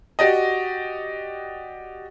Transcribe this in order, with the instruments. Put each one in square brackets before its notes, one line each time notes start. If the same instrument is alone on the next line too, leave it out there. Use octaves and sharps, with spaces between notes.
[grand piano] F#4 G4 D5 D#5